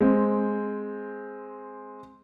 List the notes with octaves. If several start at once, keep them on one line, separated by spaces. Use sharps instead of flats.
G#3 C4